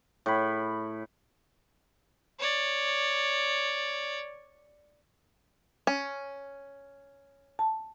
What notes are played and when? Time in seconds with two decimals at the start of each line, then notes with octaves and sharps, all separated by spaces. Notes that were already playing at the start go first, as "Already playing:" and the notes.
0.26 A2 B5
2.39 C#5 D5
5.87 C#4
7.59 A5